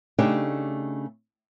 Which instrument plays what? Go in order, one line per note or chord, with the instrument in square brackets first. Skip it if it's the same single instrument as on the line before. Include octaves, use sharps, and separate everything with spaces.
[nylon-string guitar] C#3 A3 D4 D#4 G4